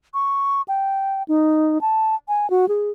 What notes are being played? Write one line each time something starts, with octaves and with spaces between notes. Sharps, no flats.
C#6
G5
D#4
A5
G#5
F#4
G#4